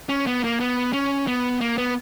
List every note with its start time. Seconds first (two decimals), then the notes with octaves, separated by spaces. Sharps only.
0.09 C#4
0.27 B3
0.44 A#3
0.60 B3
0.93 C#4
1.27 B3
1.61 A#3
1.78 B3